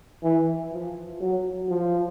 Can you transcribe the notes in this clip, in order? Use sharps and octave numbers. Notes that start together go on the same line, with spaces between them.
E3
F3
F#3
F3